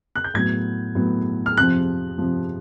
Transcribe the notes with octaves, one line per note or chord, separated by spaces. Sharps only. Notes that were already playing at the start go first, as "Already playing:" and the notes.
F#6
G6
A2 F#3 B3 G#6
A2 F#3 B3
F6
F2 C3 F3 F#6
F2 C3 F3